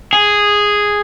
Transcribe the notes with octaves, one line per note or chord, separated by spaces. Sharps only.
G#4